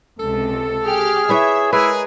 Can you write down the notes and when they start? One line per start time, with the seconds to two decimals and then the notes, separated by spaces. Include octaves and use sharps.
0.20 C#2 C3 A4
0.84 G4 G#4 F6
1.29 E4 B4 C#5 E5
1.73 G#3 E4 G#4 A#4 B4